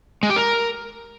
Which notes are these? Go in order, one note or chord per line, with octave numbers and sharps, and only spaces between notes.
G#3
G4
A#4